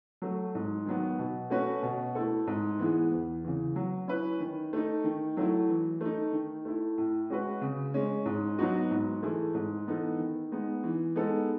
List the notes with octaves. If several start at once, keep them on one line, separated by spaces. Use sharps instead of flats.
F#3 A3
G#2
D#3 F#3 B3
B2
A3 C#4 F#4 B4
B2
A3 E4 A4
G#2
E3 B3 E4 G#4
E2
C#3 E3
F#3
C#4 E4 B4
D#3
A3 D#4
D#3
F#3 A3 E4
E3
A3 D#4
D#3
A3 E4
A2
G#3 C#4 F#4 B4
C#3
G#3 C#4
G#2
F#3 B3 D#4 F#4
G#2
E3 A3 E4 G#4
G#2
E3 B3 D#4 A4
D#3
G#3 B3 D#4
E3
G#3 B3 D#4 A4